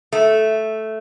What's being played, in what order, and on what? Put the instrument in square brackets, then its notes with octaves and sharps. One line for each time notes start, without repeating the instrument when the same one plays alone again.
[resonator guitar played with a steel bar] A3